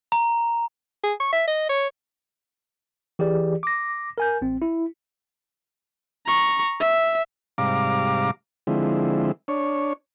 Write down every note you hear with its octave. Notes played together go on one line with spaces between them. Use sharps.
A#5
G#4
C#6
E5
D#5
C#5
E3 G4 G#4 D5
D6 A#6
A#4 G#5 G6
A1 C4
E4
A#5 C#6
E5
G#2 C3 G3 F5 A#5 D6
D3 F3 G#3 C4 E4
D4 C#5